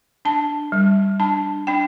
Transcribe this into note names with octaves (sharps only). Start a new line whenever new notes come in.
D4 A5
G3
D4 A5
D4 G5